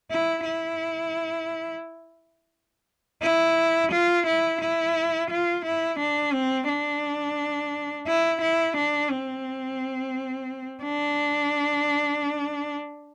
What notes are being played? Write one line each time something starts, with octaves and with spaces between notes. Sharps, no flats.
E4
E4
E4
F4
E4
E4
F4
E4
D4
C4
D4
E4
E4
D4
C4
D4